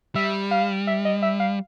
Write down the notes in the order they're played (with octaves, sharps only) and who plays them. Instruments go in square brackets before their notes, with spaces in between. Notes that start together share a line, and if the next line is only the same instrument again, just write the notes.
[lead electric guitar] G3 [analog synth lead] E5
[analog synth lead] F5
E5
D#5
E5
F5